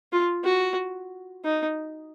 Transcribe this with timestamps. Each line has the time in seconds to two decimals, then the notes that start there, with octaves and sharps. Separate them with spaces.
0.13 F4
0.45 F#4
1.45 D#4